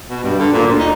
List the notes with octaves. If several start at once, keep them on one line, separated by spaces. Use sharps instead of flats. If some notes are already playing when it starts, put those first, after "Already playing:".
B2
G2
D3
A#2
D2
D#4